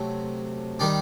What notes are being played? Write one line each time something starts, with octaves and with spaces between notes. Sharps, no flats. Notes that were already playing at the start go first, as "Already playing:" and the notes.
Already playing: C3 F#3 A3 C4
D#3 G3 D4